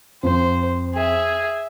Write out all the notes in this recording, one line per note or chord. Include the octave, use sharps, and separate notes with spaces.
F2 C5
G#4 E5